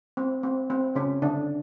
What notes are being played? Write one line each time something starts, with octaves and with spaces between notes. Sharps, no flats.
C4
C4
C4
C#3 C#4
D3 D4